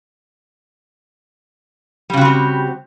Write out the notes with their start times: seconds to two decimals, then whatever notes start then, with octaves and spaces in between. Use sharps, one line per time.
2.10 G3
2.13 C#3
2.17 F#4
2.21 C4
2.25 G4